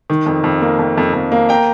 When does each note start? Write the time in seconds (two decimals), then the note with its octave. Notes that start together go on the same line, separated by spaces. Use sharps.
0.10 D#3
0.26 F2
0.44 F2
0.61 A#3
0.79 F2
0.98 F2
1.14 F2
1.32 A#3
1.49 G5 A#5